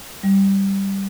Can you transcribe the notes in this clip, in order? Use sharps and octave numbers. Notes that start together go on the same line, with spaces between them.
G3